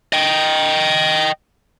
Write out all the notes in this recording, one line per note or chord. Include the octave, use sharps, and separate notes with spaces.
D#5 G5